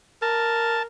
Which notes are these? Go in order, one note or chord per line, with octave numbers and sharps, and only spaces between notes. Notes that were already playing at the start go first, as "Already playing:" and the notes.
A#4 A5